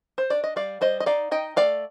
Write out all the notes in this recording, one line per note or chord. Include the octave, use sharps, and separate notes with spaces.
C5
D4 D5
D#5
G3 D5 F5
G3 C5 D#5
D#5
D#4 D5 F5
D#4 D#5 G5
A3 D5 F5